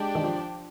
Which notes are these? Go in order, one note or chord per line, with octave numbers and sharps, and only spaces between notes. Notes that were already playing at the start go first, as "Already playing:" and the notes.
Already playing: G#3 D4 G4 D5 G5
D#3
F3